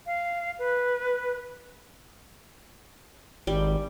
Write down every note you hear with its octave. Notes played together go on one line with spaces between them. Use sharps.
F5
B4
G#1 G3